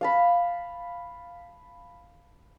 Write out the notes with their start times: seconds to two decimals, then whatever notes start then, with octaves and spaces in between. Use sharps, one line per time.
0.01 F5 A5 B5